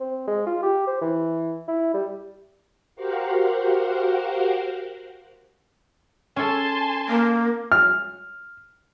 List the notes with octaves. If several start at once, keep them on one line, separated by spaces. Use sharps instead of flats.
C4
G#3
F4
G4
C5
E3
E4
G3
F#4 G4 A#4 C5 F5 F#5
C#4 A4 G#5 A5 C6
A#3
F6